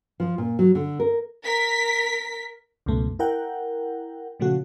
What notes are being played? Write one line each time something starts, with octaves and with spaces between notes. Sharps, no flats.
F3
A#2
F#3
D3
A#4
A#4 B6
C#2 F#2 B2 A3
E4 A#4 F#5 G5
A#2 C#3 F3 A3 F#4